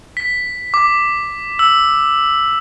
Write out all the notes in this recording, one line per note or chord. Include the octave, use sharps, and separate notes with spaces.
B6
D6
E6